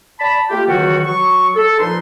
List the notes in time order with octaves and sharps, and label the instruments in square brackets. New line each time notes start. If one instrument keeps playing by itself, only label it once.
[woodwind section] D5 A5 B5
A3 A#3 F4 G4
C#2 D#3 E3 F#3 G3 F#4
F#3 C#6
A4
A#2 F3 D#4 B4 C6